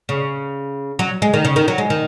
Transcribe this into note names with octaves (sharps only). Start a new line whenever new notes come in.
C#3
F#3
G#3
D#3
C#3
D#3
F#3
G#3
D#3